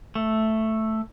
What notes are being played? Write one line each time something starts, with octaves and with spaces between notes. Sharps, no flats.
A3